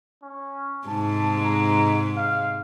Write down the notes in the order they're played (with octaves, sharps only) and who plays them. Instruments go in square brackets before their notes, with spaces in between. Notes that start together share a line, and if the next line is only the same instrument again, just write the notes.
[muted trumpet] C#4
[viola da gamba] G#2 C3 G#3 [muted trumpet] A5
[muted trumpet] A#5
F5